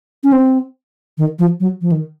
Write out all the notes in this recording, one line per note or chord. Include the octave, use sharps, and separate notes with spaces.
C#4
C4
D#3
F3
F#3
F3
D#3